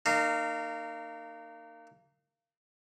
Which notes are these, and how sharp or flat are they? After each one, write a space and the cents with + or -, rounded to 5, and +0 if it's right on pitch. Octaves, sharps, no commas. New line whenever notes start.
A#3 -20 D#4 -35